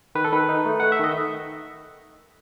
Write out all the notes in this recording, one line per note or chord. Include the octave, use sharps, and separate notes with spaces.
D#3 B4
A4
D#3 B4
D#4
A3
A3 F#5
E5
D#3 D#5